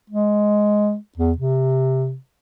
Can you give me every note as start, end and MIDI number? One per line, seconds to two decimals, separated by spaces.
0.10 0.96 56
1.18 1.33 40
1.38 2.16 48